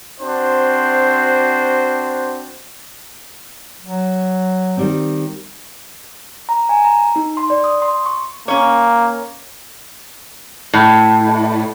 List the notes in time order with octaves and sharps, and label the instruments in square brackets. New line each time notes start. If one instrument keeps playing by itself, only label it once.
[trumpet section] C4 D4 F#4 C5
[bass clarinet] F#3
[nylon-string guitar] D#3 G3 C4
[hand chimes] A#5
G#5
A#5
D#4
C6
D5
D#6
C6
C#6
[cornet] A#3 [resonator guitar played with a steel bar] C#4 C#5
[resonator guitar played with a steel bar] A2